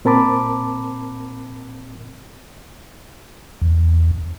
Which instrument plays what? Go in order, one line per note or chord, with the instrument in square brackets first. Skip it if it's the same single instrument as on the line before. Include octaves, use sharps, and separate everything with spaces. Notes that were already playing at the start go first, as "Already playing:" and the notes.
[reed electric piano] A#2 C4 A#4 A5 B5 D6
[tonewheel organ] E2